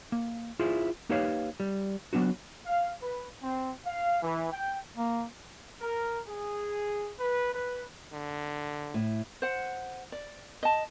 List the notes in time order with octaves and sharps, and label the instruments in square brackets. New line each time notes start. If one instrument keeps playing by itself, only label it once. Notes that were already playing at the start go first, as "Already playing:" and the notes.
[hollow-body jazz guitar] A#3
E4 F4 G#4 C5
A#3 D#4 G4 B4 C#5 F5
G3
F#3 B3 D4 F#4
[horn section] F5
B4
C4
F5
E3
G5
[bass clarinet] A#3
[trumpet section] A#4
G#4
B4
B4
[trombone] D3
[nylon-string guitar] A2
[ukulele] C5 F#5
D5
D#5 A5